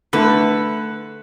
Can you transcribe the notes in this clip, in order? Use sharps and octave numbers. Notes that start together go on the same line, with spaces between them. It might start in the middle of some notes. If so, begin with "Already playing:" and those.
D3 A3 B4